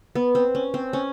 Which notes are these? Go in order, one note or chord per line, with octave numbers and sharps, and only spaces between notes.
B3
C4
C#4
C4
C#4